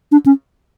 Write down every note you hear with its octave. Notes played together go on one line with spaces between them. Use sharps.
D4
C#4